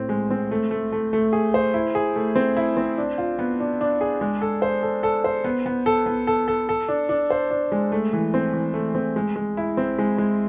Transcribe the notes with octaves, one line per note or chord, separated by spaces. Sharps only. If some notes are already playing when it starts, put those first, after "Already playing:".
Already playing: A2 C4
G#3
C4
A3
A3
A3
A3
G#4
C5
E4
G#4
A3
C4
E4
C4
D4
F4
B3
D4
D4
G#4
G#3
A4
C5
A4
A4
C5
B3
B3
A4
B3
A4
A4
A4
D4
D4
C5
D4
G#3
A3
E3
C4
E3
A3
C4
G#3
G#3
E4
C4
G#3
G#3